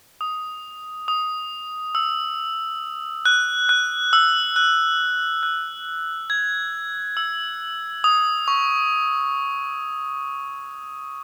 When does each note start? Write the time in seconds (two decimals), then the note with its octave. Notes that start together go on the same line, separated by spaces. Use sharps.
0.21 D#6
1.08 D#6
1.95 E6
3.25 F#6
3.69 F#6
4.13 E6
4.56 F#6
5.43 F#6
6.30 G#6
7.17 E6
8.04 D#6
8.48 C#6